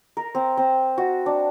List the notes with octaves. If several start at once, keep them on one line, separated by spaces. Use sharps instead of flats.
A#4
C4
C4
F#4
D4